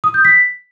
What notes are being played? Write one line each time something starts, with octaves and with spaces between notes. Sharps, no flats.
D#6
G6
B6